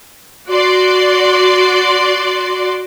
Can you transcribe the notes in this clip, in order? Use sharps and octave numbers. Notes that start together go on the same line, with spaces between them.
F#4 D5 C6